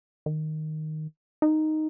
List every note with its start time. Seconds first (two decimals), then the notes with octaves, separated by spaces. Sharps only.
0.26 D#3
1.42 D#4